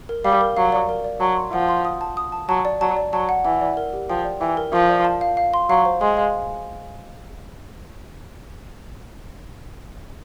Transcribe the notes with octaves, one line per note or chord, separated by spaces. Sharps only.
A#4
G3 F5
A#4
F#3 F5
D5
A#4
D5
F#3 A5
C6
F3 F#5
C6
D#6
A5
D#6
A5
F#3 A5
D5
F#3 A5
D5
F#3 A5
F#5
E3 F#5
D5
A#4
G4
F3 G5
D5
E3 G5
A#4
F3 A#4
D5
A5
F5
F5
C6
F#3 F5
C5
G#3 C6
F5